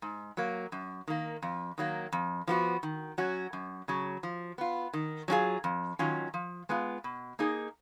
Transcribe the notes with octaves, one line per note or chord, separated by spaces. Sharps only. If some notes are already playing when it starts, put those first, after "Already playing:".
G#2
F#3 A#3
F#2
D#3 A#3
F2
D#3 F#3 A#3
F2
F3 B3 F#4
D#3
F#3 C#4 F#4
F#2
C#3 F#3
F3
B3 F4
D#3
F#3 C#4 F4 G#4
F2
D#3 F#3 C#4 F4
F3
G#3 B3 F4
B2
A#3 D#4 G#4